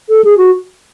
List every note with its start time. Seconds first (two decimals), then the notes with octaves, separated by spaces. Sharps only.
0.09 A4
0.25 G#4
0.38 F#4